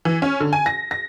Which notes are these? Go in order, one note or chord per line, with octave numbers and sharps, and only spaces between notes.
E3
C#4
D3
G#5
A#6
A#6